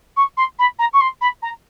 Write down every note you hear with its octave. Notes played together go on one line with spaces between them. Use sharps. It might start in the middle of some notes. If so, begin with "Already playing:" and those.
C#6
C6
B5
A#5
C#6
C6
B5
A#5